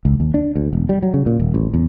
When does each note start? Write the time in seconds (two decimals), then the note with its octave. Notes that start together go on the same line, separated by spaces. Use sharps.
0.05 C#2
0.20 D#2
0.34 D4
0.56 D2
0.73 E1
0.89 G3
1.03 F#3
1.14 C#3
1.26 A#2
1.39 D#1
1.54 A1
1.74 E2